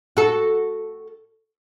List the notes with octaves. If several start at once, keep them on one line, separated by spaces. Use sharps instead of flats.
F#4 A4